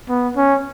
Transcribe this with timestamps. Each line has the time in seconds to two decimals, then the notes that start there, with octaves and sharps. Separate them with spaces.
0.09 B3
0.36 C#4